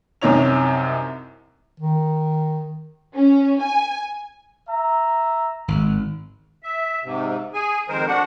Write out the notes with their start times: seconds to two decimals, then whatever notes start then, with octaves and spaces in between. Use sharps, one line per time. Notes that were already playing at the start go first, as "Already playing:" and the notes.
0.22 C2 F#2 C3 D#4 C#5 F7
1.80 D#3
3.15 C#4
3.61 G#5
4.68 E5 A#5
5.68 G#1
6.63 E5
7.04 G#2 C3
7.54 G#4 G#5
7.89 F2 D#3 G#3 A#4 C5
8.07 D4 F#4 F#5